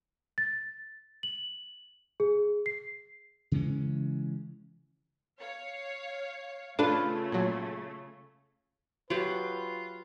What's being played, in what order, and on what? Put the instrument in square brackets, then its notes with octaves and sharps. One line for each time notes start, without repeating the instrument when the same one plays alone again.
[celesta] A6
F#7
G#4
C7
[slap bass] C#3 E3 G#3 C#4
[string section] C#5 F5
[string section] C#3 A3 [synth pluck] D4 [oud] F4 A4 B4
[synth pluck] A#2 F#3
[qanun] F#3 G4 [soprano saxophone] F4 [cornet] B4